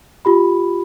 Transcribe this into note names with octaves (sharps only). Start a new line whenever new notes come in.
F4 G4 B5